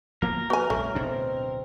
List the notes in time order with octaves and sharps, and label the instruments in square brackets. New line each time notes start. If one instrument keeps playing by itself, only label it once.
[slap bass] F3 A#3 B3 [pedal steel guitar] A#4
[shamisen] F#4 G#5 [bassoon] B4
[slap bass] A#1 F2 G3 [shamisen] A3 [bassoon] C#4
[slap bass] D1 B2 D4 [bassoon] C4